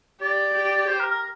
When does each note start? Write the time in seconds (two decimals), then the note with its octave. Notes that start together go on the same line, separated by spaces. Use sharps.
0.21 G4 D5
0.55 G4
0.88 C5
1.00 A#4
1.10 A#4